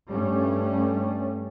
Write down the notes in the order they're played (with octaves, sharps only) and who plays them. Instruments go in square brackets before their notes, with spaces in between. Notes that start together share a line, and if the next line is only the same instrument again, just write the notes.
[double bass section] G2 G3 A3 C#4